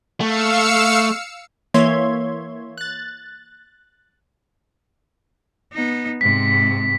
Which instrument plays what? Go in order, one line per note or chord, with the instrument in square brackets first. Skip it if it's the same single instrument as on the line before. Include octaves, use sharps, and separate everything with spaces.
[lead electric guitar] A3 [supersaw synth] F5 E6 C#7
[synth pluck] E3 A#3 C#5 E5 C6 G#6
F#6 A6
[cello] B3 D#4
[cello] G#2 C3 [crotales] B6